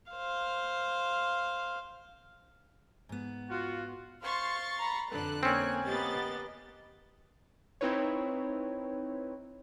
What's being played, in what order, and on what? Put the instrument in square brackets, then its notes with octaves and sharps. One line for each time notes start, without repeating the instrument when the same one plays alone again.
[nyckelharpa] C5 F5
[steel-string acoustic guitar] G#2 B3
[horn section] F4 F#4
[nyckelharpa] C5 F5 [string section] C6 C#6 A6
[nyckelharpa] A#5 B5
[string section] F2 D3 F#6 [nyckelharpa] A4 B4
[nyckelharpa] A#3 G#5 [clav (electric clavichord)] C4 C#4
[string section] A#3 B3 A6 [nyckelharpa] G4 D#5
[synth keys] C4 D#4 E4 B4 C#5